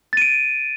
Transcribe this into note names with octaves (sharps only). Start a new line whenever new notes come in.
A6 D7 D#7